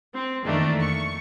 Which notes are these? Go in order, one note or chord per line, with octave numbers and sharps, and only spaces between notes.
C4
F2 D#3 E3 A3 A#3 D4
C#6